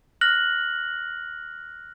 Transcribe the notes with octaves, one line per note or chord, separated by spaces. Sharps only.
F6 F#6 A#6 F#7